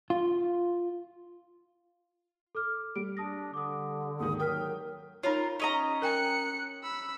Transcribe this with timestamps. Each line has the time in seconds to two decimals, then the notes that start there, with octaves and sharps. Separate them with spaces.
0.10 F4
2.55 A4 D6 F6
2.96 G3 D7
3.17 D4 A5 D#6 A#6
3.53 D3 D6 D#6
4.20 D#2 G#2 D#3 D#6
4.40 F#3 A#4 G5 D#6 F6 B6
5.23 D#4 F4 A#4 C#5
5.60 C#4 D#5 A#5
6.02 A#4 G5 G#5 F#6 C#7
6.83 B5 E6